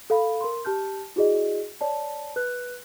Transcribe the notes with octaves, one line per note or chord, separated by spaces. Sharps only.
A4 F5 B5
A#4 C6
G4 A5 F6 G6
E4 F#4 G#4 D5 D#5
C#5 D5 A5
B4 F#6